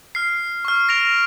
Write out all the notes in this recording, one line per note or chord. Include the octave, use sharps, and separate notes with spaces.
F6 C7
C#6 F6
A#6 D7 F7